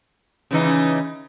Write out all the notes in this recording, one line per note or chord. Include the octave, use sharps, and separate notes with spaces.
C#3 E3 D#4